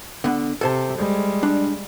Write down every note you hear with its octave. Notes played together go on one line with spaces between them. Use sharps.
D3 B3
C3 A4 C5 A5
G3 G#3
D4